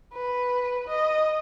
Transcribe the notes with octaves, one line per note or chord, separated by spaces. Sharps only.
B4
D#5